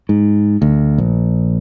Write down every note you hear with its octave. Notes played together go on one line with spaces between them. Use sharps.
G#2
D2
A#1